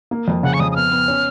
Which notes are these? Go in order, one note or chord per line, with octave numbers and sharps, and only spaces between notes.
A#3
F2
C#3 F#5
C#6
F2 D#6
D#6
B3 F6
B3
C#4